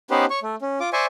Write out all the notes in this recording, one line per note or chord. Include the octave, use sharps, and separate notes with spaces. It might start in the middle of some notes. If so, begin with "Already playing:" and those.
B3 C#4 D#4 G4 B4 C5
C#5 C#6
A3
C#4
F4 D6
C5 D5 E5 G#5 C#6